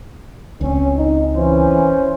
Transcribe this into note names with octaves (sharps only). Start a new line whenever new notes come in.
C#2 C4 C#4
D#4
E3 C#4 C5